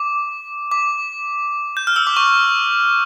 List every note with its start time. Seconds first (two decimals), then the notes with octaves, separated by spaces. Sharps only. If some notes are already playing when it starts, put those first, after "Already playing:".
Already playing: D6
0.71 D6
1.77 G6
1.87 F6
1.96 E6
2.07 D6
2.17 C#6